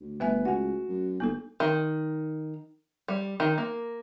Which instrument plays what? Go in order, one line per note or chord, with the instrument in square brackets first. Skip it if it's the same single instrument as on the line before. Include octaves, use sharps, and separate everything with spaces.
[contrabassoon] D2
[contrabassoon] G1 [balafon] A3 E5 G#5 [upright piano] B4
[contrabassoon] C#2 [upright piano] F#4 [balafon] F#5 G#5
[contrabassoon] F#2
[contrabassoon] G1 [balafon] A#3 D#4 A4
[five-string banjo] D#3
G3
D#3
A#3